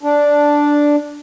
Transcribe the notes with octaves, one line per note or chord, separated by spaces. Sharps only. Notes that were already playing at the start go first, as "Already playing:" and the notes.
D4